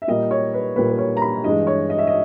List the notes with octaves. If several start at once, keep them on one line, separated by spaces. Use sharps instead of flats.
E5
A#2 G3 A#3 D#5
C#5
B4
A#2 G3 A#3 B4
B4
C#5
A#5
B5
G2 E3 G#3 D#5
C#5
D#5
E5
D#5